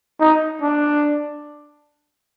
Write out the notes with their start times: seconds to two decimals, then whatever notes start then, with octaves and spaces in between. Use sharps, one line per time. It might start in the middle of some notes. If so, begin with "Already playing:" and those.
0.20 D#4
0.62 D4